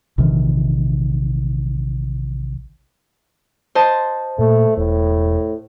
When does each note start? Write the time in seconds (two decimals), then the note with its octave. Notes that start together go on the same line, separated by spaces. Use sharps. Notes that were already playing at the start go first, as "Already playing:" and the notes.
0.18 A#1 C3 D#3 E3
3.75 C5 D#5 A5
4.39 A#2 A3
4.77 E1 A2